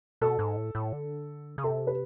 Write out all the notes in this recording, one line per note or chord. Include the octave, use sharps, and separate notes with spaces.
B2 A4
G#2
A2
A2
D3
C#3
C3 A4
B4